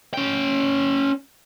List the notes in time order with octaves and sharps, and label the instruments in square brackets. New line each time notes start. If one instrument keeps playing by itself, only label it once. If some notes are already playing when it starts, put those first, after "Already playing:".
[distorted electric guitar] C#4 G5